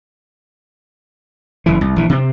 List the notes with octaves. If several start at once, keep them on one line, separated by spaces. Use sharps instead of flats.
F#1 E3
C2
A#1 E3
C3 C4